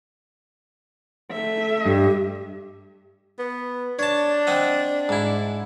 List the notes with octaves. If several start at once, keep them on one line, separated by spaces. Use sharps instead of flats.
A3 E5
G2 G4
B3
D4 C#5 A5
C4 D#5 F#5
G#2 E4